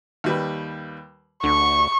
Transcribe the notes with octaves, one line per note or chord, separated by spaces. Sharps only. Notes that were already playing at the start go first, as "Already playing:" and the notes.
D#2 G3 B4
D2 D3 C#6